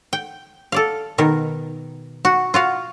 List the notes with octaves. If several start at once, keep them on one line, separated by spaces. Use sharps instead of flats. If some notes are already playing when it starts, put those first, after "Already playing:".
G5
A4 D5 F5
B2 D#3 A#4
F#4
F4 F#4 F5